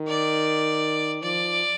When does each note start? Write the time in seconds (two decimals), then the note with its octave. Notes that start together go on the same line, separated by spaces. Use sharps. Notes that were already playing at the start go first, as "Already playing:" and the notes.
Already playing: D#3
0.08 D5
1.23 F3 D5